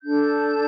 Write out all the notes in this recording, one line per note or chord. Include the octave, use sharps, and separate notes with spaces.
D4 A4 G6